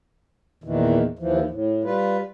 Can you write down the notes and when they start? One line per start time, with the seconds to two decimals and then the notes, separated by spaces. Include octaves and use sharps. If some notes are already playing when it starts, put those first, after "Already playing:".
0.64 E2 A#2 D#3 E3
1.19 D#2 E3 F3
1.50 A2
1.84 G3 F4 B4